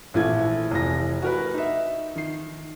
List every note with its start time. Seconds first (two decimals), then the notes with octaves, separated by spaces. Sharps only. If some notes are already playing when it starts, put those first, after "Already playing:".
0.14 A#1 E3 A3 E4 G#6
0.71 F1 E3 A#6
1.22 F#4 A#4 B4
1.54 D#4 E5
2.16 D#3 C7